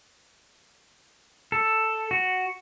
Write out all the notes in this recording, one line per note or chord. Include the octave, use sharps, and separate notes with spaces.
A4
F#4